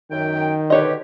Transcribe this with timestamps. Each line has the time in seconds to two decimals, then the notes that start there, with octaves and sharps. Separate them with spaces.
0.11 F#2 D#3 G5
0.70 B2 D3 G4 B4 C#5 D#5